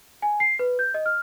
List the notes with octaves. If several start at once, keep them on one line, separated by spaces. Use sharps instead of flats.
G#5
C7
B4
G6
D#5
F6